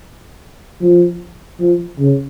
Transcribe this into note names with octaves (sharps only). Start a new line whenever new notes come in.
F3
F3
C#3